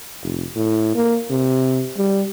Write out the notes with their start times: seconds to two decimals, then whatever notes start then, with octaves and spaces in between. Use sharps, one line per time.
0.23 F1
0.55 A2
0.95 A#3
1.30 C3
1.97 G3